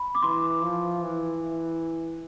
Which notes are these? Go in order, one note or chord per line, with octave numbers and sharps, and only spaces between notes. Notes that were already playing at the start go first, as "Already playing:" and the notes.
Already playing: B5
D6
E3 C6
F3
E3